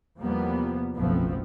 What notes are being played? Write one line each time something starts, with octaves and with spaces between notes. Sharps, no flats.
E2 C3 F3 G3 A#3 B3
F#1 B1 F3 A3 B3 C4